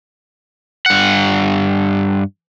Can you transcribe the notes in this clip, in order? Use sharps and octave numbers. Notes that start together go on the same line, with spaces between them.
G2 F#5